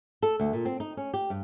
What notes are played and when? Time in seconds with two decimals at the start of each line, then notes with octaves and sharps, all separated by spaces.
0.22 A4
0.40 D2
0.53 A#2
0.65 C4
0.80 D#4
0.97 C#4
1.14 G4
1.30 G2